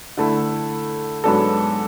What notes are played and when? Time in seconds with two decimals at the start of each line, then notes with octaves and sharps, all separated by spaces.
0.17 D3 A3 E4 A4
1.24 G#2 F#3 B3 D4 A4